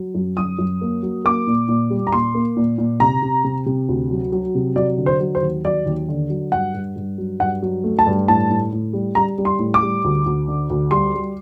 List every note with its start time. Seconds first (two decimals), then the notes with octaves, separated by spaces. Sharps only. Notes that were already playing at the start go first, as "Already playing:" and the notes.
Already playing: F#3
0.15 F#2
0.37 F#2 D#6
0.59 F#2
0.81 A#3
1.03 F#3
1.24 A#3 D6
1.47 A#2
1.69 A#2
1.90 G3
2.07 A#5
2.12 A#2 C6
2.35 A#3
2.57 A#2
2.78 A#2
3.00 C3 A#5
3.22 C3
3.44 C3
3.66 C3
3.89 D2
4.11 F#3
4.32 F#3
4.55 C3
4.76 F#3 D5
4.98 D3
5.06 C5
5.20 F#3
5.35 C5
5.42 D#2
5.65 F#3 D5
5.86 D#2
6.09 D3
6.30 F#3
6.52 G2 F#5
6.74 G2
6.96 G2
7.18 F#3
7.40 G2 F#5
7.62 F#3
7.84 A3
7.99 A5
8.07 G2
8.28 A2 A5
8.50 A2
8.72 A2
8.93 G3
9.15 G3 A#5
9.38 G3
9.45 C6
9.59 A2
9.74 D6
9.82 G3
10.04 D2
10.26 D2
10.48 D3
10.70 D2
10.91 G3 C6
11.14 G3